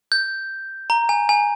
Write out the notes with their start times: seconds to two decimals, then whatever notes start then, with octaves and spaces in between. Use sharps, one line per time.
0.12 G6
0.90 A#5
1.09 G#5
1.29 G#5